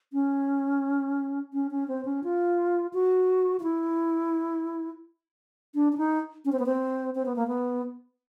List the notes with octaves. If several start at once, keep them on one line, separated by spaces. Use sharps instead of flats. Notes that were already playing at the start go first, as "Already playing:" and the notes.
C#4
C#4
C#4
C4
C#4
F4
F#4
F4
E4
D4
D4
D#4
C#4
C4
B3
C4
C4
B3
A#3
B3